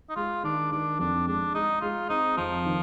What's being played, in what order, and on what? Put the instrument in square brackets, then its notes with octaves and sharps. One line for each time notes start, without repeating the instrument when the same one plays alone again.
[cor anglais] D#4
[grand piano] G#3 [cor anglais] F4
[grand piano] D#3 [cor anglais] D4
[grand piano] D#3 [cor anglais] D4
[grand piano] F2 [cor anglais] D4
[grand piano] G#3 [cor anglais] D4
[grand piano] G#3 [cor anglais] D#4
[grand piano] G#3 [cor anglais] F4
[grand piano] C4 [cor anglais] D#4
[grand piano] F2 [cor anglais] F3
[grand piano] D#3